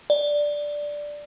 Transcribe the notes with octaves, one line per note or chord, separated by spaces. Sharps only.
D5